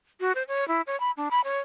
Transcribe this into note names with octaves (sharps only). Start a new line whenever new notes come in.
F#4
C5
C#5
E4
C#5
B5
D4
B5
C#5